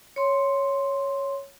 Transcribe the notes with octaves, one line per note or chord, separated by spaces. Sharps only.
C#5 C6